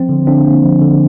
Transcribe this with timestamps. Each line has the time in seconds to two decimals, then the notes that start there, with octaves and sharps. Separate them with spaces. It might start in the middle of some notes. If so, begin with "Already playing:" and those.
Already playing: F3 C4
0.09 D3
0.27 D3 C4 D4
0.45 A#3
0.63 F3
0.81 D3